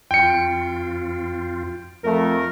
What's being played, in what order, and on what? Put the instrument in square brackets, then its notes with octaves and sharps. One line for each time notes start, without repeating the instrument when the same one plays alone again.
[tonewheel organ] F2 F4 [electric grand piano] G5 C#7
[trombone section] F2 A3 [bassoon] A#4